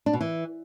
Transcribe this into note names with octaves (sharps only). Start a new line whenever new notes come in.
D4
B2
E3